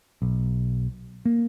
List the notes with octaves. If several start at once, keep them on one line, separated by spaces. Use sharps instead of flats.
B1
A#3